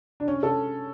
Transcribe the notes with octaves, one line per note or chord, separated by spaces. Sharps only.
D4
C#4
A4